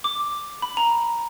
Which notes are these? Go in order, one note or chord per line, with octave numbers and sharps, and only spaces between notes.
D6
B5
A#5